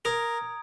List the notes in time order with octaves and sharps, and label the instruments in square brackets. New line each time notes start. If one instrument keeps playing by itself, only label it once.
[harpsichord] A#4 [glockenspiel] A#5 D#6 G#6 D7